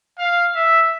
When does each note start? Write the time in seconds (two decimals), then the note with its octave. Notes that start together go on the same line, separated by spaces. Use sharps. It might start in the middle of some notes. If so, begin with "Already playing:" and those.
0.18 F5
0.55 E5